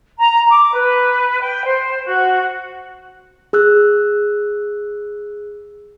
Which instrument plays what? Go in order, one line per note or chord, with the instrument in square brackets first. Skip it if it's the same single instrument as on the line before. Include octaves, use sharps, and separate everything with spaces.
[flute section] A#5
D6
B4
G5
C5
F#4
[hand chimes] G#4 E6 F#6